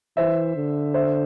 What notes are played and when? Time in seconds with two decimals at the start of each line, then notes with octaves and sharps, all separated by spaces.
0.17 E3 C5 E5
0.56 D3
0.94 C5 E5